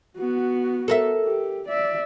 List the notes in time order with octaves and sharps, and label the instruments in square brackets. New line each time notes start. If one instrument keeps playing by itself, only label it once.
[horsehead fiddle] B3 F#4
[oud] A4 A#4 E5
[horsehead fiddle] G4
D5 E5